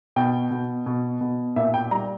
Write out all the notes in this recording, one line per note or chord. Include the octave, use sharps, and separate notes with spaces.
B2 G5
B2
B2
B2
A#2 E5
G5
G3 A#5